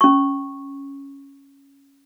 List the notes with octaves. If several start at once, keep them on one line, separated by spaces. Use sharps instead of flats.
C#4 C#6